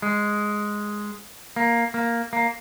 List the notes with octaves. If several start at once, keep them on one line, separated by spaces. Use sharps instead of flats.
G#3
A#3
A#3
A#3